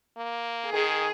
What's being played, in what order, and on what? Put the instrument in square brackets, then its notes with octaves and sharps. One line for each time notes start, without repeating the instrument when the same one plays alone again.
[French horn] A#3
[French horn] D#3 [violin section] G#4